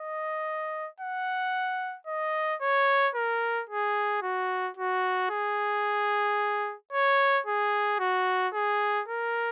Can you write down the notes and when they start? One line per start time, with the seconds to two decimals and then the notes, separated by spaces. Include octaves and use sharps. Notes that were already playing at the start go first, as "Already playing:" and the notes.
Already playing: D#5
1.00 F#5
2.07 D#5
2.61 C#5
3.15 A#4
3.69 G#4
4.22 F#4
4.77 F#4
5.30 G#4
6.92 C#5
7.46 G#4
8.00 F#4
8.54 G#4
9.08 A#4